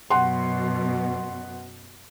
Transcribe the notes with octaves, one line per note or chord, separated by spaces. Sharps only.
F#2 B2 F#5 C6